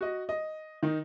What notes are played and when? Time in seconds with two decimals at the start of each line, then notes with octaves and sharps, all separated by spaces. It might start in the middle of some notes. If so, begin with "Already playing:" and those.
0.01 F#4 D#5
0.29 D#5
0.83 D#3 D#4